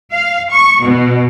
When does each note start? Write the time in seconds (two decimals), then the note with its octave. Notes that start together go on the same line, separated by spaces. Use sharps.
0.12 F5
0.51 C#6
0.83 B2